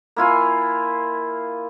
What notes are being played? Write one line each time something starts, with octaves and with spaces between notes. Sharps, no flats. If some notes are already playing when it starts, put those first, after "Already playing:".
A#3 E4 F4 G#5